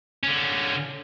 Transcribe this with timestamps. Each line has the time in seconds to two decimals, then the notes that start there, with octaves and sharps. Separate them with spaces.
0.24 D3 C#4